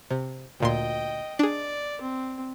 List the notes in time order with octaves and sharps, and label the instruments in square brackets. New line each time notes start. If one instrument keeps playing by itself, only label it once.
[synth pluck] C3
[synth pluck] D2 A#2 C6 [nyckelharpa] D#5 G5
[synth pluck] D4 G#4 [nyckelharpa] D5
[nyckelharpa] C4